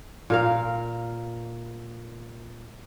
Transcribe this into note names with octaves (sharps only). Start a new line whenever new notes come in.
A#2 A#4 F5